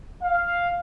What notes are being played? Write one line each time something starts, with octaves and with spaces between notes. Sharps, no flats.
F5